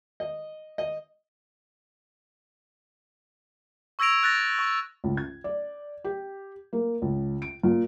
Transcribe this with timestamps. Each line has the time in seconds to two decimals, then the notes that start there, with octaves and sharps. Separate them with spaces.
0.20 D#5
0.78 D#5
3.99 C#6 E6 G#6 A#6 D7 F7
4.23 F#6 A6 A#6 D7
4.59 C#6
5.04 C#2
5.17 G#6
5.44 D5
6.04 G4
6.73 A#3
7.02 C#2
7.42 D7
7.63 A#2